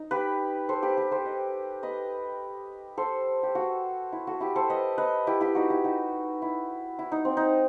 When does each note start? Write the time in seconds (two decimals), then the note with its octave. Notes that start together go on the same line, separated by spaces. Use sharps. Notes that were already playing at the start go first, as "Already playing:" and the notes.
Already playing: D#4
0.11 G4 B4
0.69 A4 C5
0.83 G4 B4
0.97 G4 B4
1.11 A4 C5
1.25 B4 D#5
1.83 B4 D#5
2.98 A4 C5
3.43 G4
3.55 F#4 A4
4.12 E4
4.27 F#4 A4
4.41 E4 G4
4.56 A4 C5
4.70 B4 D#5
4.98 B4 D#5
5.27 E4 G4
5.41 E4 G4
5.55 D#4 F#4
5.70 E4 G4
5.84 D#4 F#4
6.42 E4
6.99 E4
7.12 D#4
7.25 C4
7.37 D#4